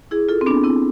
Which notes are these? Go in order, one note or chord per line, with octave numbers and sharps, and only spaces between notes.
E4 G#4
F4 A4
C4
B3 D4
C4 E4